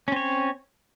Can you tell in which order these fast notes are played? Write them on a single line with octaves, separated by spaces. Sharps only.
C#4 C4 C#5